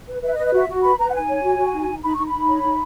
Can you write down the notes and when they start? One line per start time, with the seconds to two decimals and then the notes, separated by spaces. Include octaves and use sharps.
0.09 B4
0.23 B4 E5
0.34 D#5
0.39 B4
0.45 D#5
0.53 F#4 E5
0.68 F#4
0.84 B4 B5
0.98 B4 A#5
1.09 F#5
1.14 D#4 G#5
1.28 C#5
1.43 F#4
1.58 F#4
1.73 D#4
1.88 D#4
2.04 D#4 B5
2.14 D#4 C#6
2.26 B5
2.34 D#4
2.49 C#5
2.63 D#4